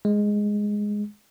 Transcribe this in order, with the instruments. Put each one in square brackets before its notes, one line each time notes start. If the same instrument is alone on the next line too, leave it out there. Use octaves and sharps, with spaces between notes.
[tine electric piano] G#3